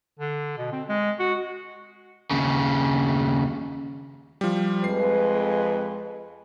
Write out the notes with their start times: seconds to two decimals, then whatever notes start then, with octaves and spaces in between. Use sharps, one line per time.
0.19 D3
0.58 B2
0.72 C4
0.89 G#3
1.19 F#4
2.31 D#2 C#3
4.41 F3 G3
4.84 F2 G#3 B4 C7